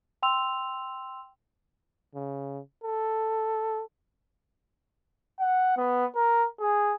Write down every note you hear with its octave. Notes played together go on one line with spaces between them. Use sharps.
G5 C6 E6 F7
C#3
A4
F#5
B3
A#4
G#4